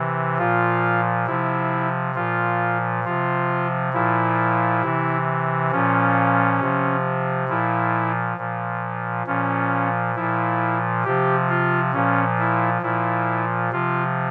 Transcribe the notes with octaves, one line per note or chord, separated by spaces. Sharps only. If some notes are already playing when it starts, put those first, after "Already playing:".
Already playing: C3 E3
A#2 F3 F4
C3 F3 E4
A#2 F3 F4
C3 F3 F4
A#2 F3 E4
C3 E3
A#2 F3 C#4
C3 F3
A#2 F3 E4
A#2 F3
A#2 F3 C#4
A#2 F3 E4
C3 F3 G4
F4
A#2 F3 C#4
E4
A#2 F3 E4
C3 F3 F4